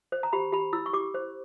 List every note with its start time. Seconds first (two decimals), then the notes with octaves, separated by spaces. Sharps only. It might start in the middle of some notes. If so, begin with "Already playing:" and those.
0.12 C5
0.23 A#5
0.33 G4 B5
0.53 G4 B5
0.73 E4 E6
0.86 C#6
0.93 G4 D6
1.14 C5